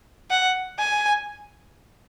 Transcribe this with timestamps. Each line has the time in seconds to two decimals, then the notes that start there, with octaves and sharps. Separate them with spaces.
0.30 F#5
0.79 G#5